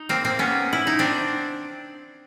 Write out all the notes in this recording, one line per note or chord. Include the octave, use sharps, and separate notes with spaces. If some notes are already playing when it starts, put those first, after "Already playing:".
Already playing: D#4
A#3 C4
A#3 C4
B3 C#4
E4
D#4
C4 D4